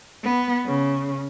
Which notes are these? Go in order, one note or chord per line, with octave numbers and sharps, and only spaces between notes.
B3
C#3